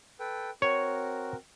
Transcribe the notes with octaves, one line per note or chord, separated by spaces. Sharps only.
A4 B4 G5
C4 F#4 A#4 C#5